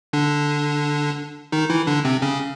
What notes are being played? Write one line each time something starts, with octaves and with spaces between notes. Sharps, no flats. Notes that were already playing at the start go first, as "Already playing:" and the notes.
D3 D4
D#3 D#4
E3 E4
D3 D4
C3 C4
C#3 C#4